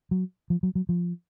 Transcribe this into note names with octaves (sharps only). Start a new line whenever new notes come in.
F#3
F3
F#3
F#3
F3